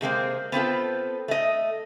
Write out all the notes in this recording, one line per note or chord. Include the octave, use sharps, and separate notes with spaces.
C3 G#3 A#3 C4
B3 C4 F4 A4
A3 D#5